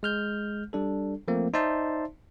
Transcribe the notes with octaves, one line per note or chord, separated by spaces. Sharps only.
G#3 F6 G6
G3 D4 A4
F3 A3 A#3 C4
D#4 C5 D5 E5 A5 C6